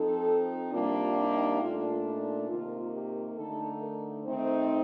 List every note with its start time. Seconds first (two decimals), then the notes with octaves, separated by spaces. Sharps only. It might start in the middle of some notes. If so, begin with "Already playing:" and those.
Already playing: F3 C4 D#4 A4
0.72 C3 G3 A#3 D4 F4
1.16 D#4
1.59 A#2 A3 D4 F4
2.04 D#4
2.47 C3 D#3 A#3 F4
2.92 G4
3.36 D3 A3 D#4 A4
3.80 A#4
4.24 D#3 A3 C4 D#4 C5